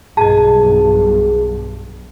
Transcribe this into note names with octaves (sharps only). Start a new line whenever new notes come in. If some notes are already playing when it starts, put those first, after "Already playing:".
B1 G2 G#4 D#5 A5